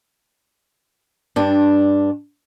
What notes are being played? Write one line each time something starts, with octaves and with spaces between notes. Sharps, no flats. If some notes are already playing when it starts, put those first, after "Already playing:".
G2 D4